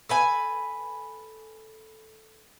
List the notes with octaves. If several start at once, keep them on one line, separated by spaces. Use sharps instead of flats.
A4 B4 G#5